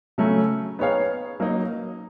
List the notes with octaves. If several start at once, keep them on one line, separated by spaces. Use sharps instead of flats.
C#3 F#3 A3 C#4
B3 D#4 G#4 C#5 F5
F#3 A#3 D#4